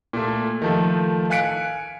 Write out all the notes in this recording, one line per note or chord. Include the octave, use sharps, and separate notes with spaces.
A#2 A3
D#3 F3 A3
F5 G#5 F#6 B6 C#7 D7